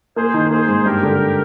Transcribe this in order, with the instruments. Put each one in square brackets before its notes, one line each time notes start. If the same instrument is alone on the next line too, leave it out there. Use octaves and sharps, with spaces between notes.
[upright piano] A#3 [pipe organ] G#4 C5
[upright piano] D#3
[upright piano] A#3 [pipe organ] G#4 C5
[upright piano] G#2
[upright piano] G2 [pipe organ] G4 A#4
[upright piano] D3